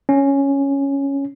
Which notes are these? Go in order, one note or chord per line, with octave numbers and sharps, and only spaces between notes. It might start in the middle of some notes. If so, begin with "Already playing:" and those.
C#4